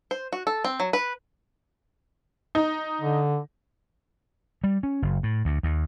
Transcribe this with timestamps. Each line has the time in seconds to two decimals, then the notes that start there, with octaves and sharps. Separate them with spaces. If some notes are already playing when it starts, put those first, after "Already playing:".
0.11 C5
0.33 F#4
0.47 A4
0.64 C4
0.80 F#3
0.93 B4
2.55 D#4
3.01 D3
4.64 G3
4.83 C#4
5.02 F#1
5.23 A2
5.45 D2
5.63 D#2